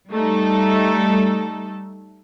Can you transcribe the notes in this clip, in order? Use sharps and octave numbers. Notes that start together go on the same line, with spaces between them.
G3 A3 D#4 A4